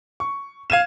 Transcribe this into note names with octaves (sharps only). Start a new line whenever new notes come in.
C#6
F5 G#6 D#7 E7